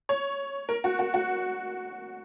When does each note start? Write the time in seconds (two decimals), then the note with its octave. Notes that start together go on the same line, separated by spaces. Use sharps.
0.09 C#5
0.69 A#4
0.84 F#4
0.99 F#4
1.14 F#4